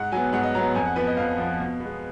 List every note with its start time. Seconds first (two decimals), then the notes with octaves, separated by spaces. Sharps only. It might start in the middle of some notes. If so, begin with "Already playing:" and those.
Already playing: G#2 F#5
0.12 F#3 B3 G#5
0.33 G#2 F#5
0.43 D#5
0.54 F#3 B3 A#5
0.75 F2 G#5
0.86 F#5
0.96 F3 B3 B4
1.07 D#5
1.17 F2 F5
1.38 F3 B3
1.60 B2
1.80 G#3 B3